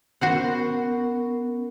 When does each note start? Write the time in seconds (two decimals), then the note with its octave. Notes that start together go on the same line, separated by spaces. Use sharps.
0.21 B3 C#4 F#4 A#4 C5 F#5